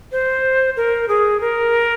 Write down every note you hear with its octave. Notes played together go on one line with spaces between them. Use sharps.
C5
A#4
G#4
A#4